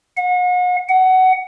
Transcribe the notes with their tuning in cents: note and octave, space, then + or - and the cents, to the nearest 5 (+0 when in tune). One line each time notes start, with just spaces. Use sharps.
F#5 -40
F#5 +15